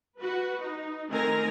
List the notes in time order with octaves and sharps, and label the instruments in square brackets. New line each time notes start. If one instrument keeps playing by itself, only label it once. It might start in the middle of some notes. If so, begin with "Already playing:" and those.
[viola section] F#4 B4
D#4
D#3 A3 C4 A#4 G#5 A#5